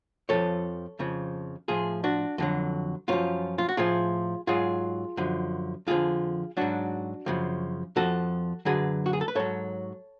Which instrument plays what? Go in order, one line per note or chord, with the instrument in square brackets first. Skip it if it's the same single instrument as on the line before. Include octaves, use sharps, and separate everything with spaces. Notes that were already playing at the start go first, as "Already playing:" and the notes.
[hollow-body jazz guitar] F2 F3 A4 C#5
F2 C#3 F3
A2 F3 F4 G#4
D4 F#4
F2 D3 F#3
F#2 F3 C#4 F4
F4
F#4
A2 F3 F4 G#4
G#2 F#3 F4 G#4
F#2 D3 F3
F2 D3 F3 F4 G#4
G#2 F#3 D4 F#4
F#2 C#3 F3
F2 F3 F#4 A4
F#2 D3 F#3 G#4 B4
F#4
G#4
A4
B4
G#2 F#3 A4 C#5